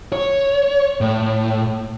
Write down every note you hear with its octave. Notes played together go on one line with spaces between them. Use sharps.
C#5
A2